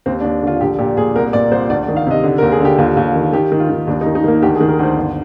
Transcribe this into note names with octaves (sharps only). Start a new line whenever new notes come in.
D#2 C4
D4
D#2
D3 F4
A#1 G4
A#2 G4
A#2 G#4
C2 A#4
A#2 D5
C2 C5
D2 D5
D5
D#3
F5
C3 D#5
D3
A#4
D#2
G#4
D3 G4
D#2 F4
D#2 F4
D#3
D#3 G4
D#3
F4
D#3
D#2 D4
D#4
D#3
D#4
D#3 A#3
D2 G4
G#4
D#3
A#4
D2 C5
G1